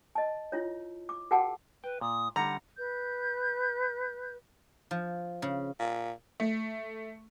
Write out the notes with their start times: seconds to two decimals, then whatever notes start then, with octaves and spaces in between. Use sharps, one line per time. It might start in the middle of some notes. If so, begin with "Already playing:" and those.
0.15 D#5 A5
0.52 E4 F4 C#5
1.09 D6
1.31 F#4 G#4 A#4 F#5 G5 A5
1.84 B4 G5
2.01 A#2 D#6
2.36 D3 G3 F#5 A#5
2.76 B4 G6
4.91 F3
5.42 C#3
5.79 A#2
6.40 A3